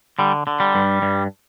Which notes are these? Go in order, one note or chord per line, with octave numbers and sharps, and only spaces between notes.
D3 G3
D3
G3
G2
G2